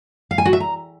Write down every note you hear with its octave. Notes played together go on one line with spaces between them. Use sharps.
F5
G#5
F#4
E5
A#5